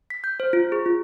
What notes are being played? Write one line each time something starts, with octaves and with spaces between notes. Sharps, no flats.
B6
G6
C5
F4
G#4
F4